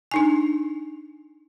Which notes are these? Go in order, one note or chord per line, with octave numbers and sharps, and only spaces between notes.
D4 D#4 G#5